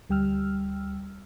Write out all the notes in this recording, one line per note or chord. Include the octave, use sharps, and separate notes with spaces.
D2 G3 G5 E6 F6